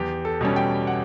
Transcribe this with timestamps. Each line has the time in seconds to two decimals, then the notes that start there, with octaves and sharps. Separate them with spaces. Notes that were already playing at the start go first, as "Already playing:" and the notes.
Already playing: E2 G4
0.25 A4
0.41 B2 G3 C#4
0.56 G5
0.87 F#5